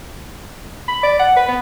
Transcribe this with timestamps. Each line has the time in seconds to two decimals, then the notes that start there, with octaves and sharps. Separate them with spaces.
0.88 B5
1.03 D5
1.19 F#5
1.36 B4
1.48 B3